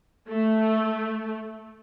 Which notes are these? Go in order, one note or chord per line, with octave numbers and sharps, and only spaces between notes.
A3